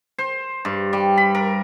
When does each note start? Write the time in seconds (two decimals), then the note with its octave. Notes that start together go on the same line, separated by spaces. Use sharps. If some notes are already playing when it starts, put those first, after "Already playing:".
0.18 C5
0.65 G2
0.93 G3
1.18 B5
1.35 A#4